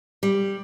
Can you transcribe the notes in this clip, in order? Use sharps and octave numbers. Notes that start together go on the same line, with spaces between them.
G3